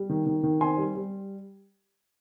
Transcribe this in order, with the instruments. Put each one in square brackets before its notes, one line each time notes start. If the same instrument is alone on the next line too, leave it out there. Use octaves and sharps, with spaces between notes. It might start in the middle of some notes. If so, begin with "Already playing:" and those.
Already playing: [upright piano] G3
D#3
D#3
D#3
C4 G#5 C6
G3
G3